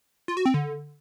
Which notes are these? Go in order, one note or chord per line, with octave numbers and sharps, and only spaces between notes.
F4
F#4
C4
D3